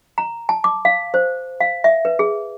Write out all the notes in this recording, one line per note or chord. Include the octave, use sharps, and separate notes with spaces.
A#5
A5
D6
F5
C5
F5
E5
B4
G#4